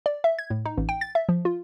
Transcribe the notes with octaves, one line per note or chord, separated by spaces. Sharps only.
D5
E5
G#6
A2
D#4
A1
G5
A6
E5
F3
F4